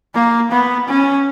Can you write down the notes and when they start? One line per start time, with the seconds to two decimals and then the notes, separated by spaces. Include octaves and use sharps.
0.15 A#3
0.52 B3
0.89 C#4